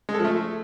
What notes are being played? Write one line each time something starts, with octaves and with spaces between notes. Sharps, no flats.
G#3
A4
F3
A3